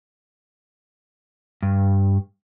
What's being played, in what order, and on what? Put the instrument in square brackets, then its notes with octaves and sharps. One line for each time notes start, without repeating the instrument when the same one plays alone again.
[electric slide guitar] G2